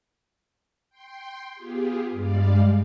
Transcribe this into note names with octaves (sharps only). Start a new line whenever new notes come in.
G5 C6
B3 F4 G4 G#4
G2 G3 G#3 D5 F5